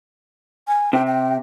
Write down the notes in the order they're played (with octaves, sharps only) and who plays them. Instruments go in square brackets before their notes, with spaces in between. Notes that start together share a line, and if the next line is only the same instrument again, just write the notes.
[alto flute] G#5
[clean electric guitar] C3 [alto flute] G5
[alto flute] G5